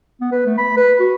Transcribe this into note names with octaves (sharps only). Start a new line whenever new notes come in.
B3
B4
A3
B5
B4
F#4